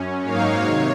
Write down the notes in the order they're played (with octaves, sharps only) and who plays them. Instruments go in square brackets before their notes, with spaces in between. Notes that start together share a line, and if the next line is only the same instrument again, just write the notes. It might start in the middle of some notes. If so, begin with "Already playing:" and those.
Already playing: [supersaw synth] F#2 C#4
G#2 F#3 A#3 D#4 C#5 F5
C3 D#3 C#5